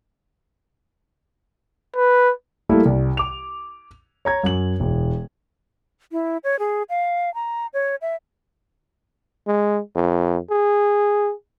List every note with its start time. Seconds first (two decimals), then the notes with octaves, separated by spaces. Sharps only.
1.96 B4
2.69 G3 A3 A#3 E4
2.85 C2
3.17 D6 F7
4.25 C#5 A#5 G#6
4.44 F#2 F#7
4.80 E1
6.12 E4
6.44 C#5
6.59 G#4
6.90 F5
7.34 A#5
7.74 C#5
8.02 E5
9.47 G#3
9.95 F2
10.50 G#4